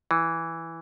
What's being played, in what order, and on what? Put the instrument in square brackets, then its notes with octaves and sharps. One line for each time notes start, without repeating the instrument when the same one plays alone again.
[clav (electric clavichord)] E3